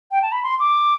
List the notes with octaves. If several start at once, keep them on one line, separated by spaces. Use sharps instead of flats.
G5
A5
B5
C6
D6